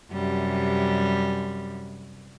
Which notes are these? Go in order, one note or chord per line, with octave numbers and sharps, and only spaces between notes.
F#2 C3 G3